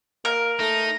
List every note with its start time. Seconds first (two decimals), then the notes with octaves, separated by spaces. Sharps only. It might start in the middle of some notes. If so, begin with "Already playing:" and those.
0.25 A#3 A#4
0.60 A3 D#4 A#6